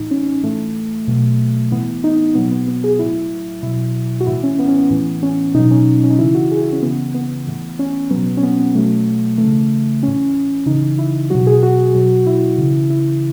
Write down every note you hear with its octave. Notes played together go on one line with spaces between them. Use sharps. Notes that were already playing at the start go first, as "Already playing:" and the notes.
Already playing: A2 E3 D#4
C#4
C#4
A2 E3 A3
B2 F#3
A2 E3 B3
D#4
B2 F#3 B3
B3
B3
G#4
A2 F#3 E4
B2 F#3 E4
F#4
A2 E3 E4
C#4
B3
C#4
B3
A2 E3
C#4
B2 F#3 D#4
C#4
C#4
D#4
C#3 E3 E4
F#4
G#4
E4
C#4
C#3 E3 B3
B3
A2 E3
C#4
B2 F#3 B3
C#4
B3
B3
B2 F#3 A3
E3 A3
C#3
A2 E3 C#4
C#3 E3 D#4
E4
B2 F#3 F#4
G#4
F#4
B2 F#3
E4
C#3 E3
E4